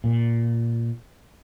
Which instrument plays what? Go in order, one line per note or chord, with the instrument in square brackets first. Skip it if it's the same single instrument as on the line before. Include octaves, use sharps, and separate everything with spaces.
[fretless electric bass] A#2